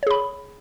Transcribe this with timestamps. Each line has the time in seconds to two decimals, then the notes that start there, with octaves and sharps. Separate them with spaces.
0.03 C#5
0.07 G#4
0.11 B5